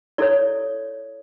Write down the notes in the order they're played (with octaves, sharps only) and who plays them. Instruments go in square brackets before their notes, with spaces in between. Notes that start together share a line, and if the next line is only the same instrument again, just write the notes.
[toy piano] E4 A4 C#5 D5